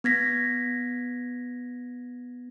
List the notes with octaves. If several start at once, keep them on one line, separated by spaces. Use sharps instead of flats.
B3 G#6 A#6 B6